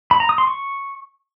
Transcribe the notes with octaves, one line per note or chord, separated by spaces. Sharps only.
B5
A#5
D#6
C6
C#6